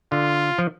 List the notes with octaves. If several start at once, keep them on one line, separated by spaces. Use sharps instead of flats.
D3 F4
F3